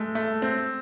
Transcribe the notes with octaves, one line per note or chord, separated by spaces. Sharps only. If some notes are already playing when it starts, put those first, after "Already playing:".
Already playing: G#3 A3
A3
C4